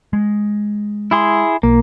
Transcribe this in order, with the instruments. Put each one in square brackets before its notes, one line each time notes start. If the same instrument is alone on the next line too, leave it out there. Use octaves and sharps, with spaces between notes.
[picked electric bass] G#3
[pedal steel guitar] E4 G#4 C6
[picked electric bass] B1 [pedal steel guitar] A#3